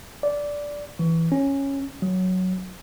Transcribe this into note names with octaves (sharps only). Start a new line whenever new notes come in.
D5
E3
C#4
F#3